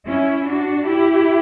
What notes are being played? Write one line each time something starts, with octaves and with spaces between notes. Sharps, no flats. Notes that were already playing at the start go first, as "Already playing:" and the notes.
C#4 E4
D4 F#4
E4 G4